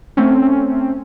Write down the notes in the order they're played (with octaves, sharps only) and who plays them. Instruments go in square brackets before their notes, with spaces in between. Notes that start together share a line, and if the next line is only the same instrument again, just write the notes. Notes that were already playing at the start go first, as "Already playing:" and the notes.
[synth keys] A3 C4 C#4